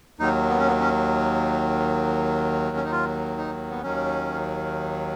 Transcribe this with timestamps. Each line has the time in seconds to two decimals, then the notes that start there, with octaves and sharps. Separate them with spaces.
0.19 D#2 D#3 F#3 D#4
0.49 B3
0.59 C#4
0.68 B3
0.80 C#4
2.77 C#4
2.84 D#4
2.91 F4
3.37 D#4
3.70 B3
3.83 D#2 D#3 F#3 C#4